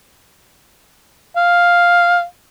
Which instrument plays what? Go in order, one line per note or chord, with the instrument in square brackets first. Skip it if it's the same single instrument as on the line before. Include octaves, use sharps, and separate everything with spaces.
[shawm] F5